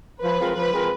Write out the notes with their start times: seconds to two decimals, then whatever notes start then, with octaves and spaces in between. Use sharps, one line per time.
0.22 F3 B4
0.39 G#3 C4 F4 A#4
0.55 F3 B4
0.72 G#3 C4 F4 A#4